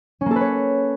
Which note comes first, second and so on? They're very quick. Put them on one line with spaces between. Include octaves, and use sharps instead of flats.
C#4 A#3 A4 B4 C#5